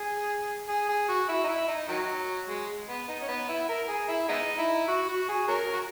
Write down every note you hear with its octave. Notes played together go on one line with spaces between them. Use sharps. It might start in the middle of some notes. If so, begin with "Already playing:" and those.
Already playing: G#4
G#4
G#4
F#4
E4
D#4
E4
D#4
D#3 F#3
G#3
B3
D#4
C#4
B3
E4
A#4
G#4
E4
G#3 B3 D#4
E4
F#4
F#4
G#4
C#4 F#4 A#4
F#4